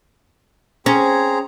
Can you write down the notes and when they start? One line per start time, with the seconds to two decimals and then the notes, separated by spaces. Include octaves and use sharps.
0.86 C4 C#4 G#4 A#5